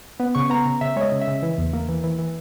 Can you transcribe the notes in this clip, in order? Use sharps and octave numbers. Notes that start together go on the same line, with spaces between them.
B3
C#3 C#6
B3 A#5
C#3
C#3 E5
G#3 C#5 D#5
C#3
E5
C#3
E3
E2
A#3
E3
E3
E3